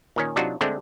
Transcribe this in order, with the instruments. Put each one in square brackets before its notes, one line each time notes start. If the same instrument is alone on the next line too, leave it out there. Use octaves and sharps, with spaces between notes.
[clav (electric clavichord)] A#2 D#3 C#4
C3 F#3 D4 D#4 F4 F#4
D3 G#3 A3 C4 D4